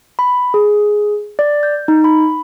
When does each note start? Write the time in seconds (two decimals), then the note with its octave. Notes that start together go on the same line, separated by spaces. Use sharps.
0.19 B5
0.54 G#4
1.39 D5
1.63 G6
1.88 D#4
2.04 B5